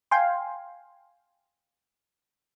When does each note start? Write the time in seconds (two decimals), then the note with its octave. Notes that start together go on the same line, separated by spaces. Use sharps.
0.11 F5 G5 G#5 C6